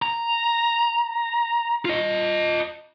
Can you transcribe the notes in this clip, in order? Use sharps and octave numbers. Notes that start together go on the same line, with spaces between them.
A#5
F4 D#5